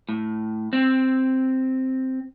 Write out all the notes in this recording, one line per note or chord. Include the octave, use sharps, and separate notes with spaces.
A2
C4